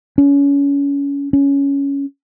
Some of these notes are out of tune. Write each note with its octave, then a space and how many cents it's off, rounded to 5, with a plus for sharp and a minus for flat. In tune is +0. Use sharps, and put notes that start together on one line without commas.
C#4 +25
C#4 +10